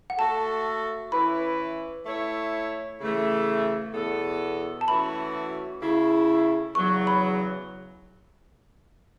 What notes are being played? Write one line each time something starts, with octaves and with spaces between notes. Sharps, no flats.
F#5
A3 F#4 A4 A5
E3 C#4 E4 B4 B5
A3 E4 C#5
C#3 E3 A3
E2 B2 B3 A4
A5
E3 A3 C#4 F#4 B5
C#3 A3 E4
E2 C#3 F#3 C#6
B5